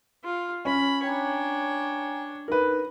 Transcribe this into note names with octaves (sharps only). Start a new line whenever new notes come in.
F4
C#4 B5
D4 C#5 G5 G#5 A#5
D#4 A#4 B4